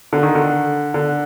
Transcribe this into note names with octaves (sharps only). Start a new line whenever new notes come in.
D3
D#3
D3
D3